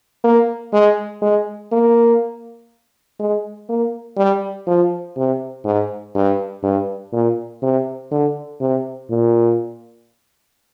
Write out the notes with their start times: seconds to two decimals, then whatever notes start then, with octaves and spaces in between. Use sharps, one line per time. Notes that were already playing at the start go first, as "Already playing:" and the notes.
0.24 A#3
0.73 G#3
1.22 G#3
1.72 A#3
3.20 G#3
3.69 A#3
4.17 G3
4.67 F3
5.17 C3
5.65 G#2
6.15 G2
6.63 G2
7.13 A#2
7.62 C3
8.11 D3
8.61 C3
9.10 A#2